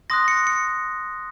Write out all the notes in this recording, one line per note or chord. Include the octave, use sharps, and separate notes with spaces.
C6 D#6 F#6 A#6
C#7
C#7